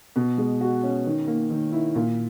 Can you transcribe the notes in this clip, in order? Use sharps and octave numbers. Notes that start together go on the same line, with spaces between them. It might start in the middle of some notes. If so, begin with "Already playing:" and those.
B2
G#3
F#4
C#4
D#3
A#3
D#3
E4
A#2